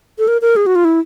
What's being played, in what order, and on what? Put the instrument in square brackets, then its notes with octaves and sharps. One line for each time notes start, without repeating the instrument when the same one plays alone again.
[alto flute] A4
A#4
A#4
G#4
F#4
F4
E4